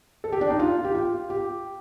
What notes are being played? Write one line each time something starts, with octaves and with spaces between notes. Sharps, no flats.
A4
G4
D4
D#4
F4
G4
F4
G4